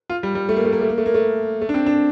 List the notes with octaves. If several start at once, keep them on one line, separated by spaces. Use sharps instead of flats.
F4
G3
G3
A3
A#3
A3
A#3
A3
A#3
A3
A#3
A3
A3
D4
C4
D4